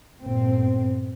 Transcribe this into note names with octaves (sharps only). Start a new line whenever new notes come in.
G1 A#2 C4